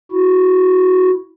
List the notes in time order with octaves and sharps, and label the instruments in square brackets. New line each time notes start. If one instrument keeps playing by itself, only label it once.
[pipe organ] E4 F#4